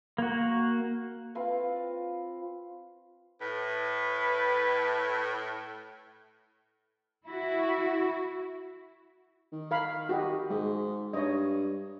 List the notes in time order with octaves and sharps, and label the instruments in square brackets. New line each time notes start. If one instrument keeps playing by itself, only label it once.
[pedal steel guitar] A#3 F#4
[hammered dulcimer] C4 F4 B4 F5
[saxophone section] A2 [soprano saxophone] B4
[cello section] E4 F#4
[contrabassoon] D#3
[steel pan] A#4 F5 B5
F#4 G4 D#5
[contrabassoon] G#2 [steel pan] G#3
[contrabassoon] G2 [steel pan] C#5 D#5